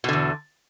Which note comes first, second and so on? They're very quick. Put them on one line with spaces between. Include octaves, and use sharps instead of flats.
B2 D3 E2